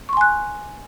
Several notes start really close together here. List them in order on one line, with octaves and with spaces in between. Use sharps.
C#6 C6 G#5 F#6